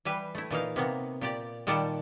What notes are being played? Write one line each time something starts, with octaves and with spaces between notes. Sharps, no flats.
E3 G3 B4
A3 E4
A#2 E3 D#4 F5
C3 A#3 B3
A#2 G4 D5
A#2 D#3 G3 D5 F#5 A5